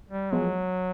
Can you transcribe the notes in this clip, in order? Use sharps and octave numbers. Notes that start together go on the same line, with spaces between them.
G3
F3 F#3 G#3 B3